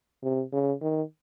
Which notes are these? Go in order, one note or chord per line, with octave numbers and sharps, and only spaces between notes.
C3
C#3
D#3